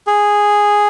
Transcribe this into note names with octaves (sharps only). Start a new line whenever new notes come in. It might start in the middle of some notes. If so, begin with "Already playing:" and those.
G#4